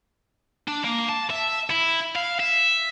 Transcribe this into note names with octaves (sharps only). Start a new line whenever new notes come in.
D4
A#3
A5
E5
E4
F5
E5